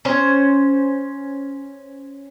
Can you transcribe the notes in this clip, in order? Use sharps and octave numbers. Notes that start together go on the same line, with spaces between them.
C#4 C5